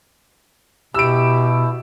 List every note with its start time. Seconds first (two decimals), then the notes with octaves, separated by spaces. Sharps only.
0.94 B2 E4 G4 E6 D7